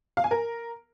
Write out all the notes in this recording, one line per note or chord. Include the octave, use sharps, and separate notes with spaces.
F5
G#5
A#4